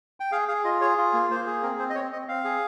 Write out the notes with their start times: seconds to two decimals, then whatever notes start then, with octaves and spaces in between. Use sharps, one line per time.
0.20 G5
0.32 G#4 F5
0.48 G#4 F5
0.64 F4 D#5
0.81 G#4 C#5
0.98 F4
1.14 A#3
1.31 A#3 C5
1.47 G#4
1.62 C4 A#4
1.79 C4 C5
1.90 D#5
1.95 C4 C#5
2.12 C4 D#5
2.28 C4 F5
2.45 G#4